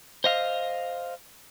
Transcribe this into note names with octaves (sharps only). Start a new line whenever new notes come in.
C5 D#5 F5